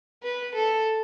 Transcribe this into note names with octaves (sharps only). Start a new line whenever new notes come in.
B4
A4